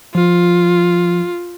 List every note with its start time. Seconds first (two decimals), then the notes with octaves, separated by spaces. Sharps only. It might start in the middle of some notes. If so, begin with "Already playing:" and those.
0.15 F3 F4